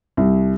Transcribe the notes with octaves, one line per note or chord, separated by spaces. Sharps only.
C2